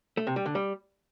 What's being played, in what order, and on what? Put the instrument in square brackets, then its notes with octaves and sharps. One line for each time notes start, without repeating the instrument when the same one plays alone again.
[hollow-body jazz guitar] A3
C3
G3
D3
G3